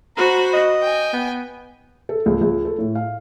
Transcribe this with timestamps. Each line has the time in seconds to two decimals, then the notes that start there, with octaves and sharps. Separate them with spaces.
0.17 F#4 C5 A#5 B5
0.53 D#5
0.82 G5 G#5
1.13 B3
2.09 A4
2.26 C#2
2.41 C#2
2.65 A4
2.79 A2
2.95 F5